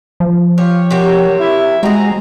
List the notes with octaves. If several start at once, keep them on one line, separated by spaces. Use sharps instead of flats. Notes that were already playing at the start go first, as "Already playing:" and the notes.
F3
F4 G4 C#5
C3 F#4 G4 A#4 C#5
E4 E5
G#3 C4 F#4 G#4 A#5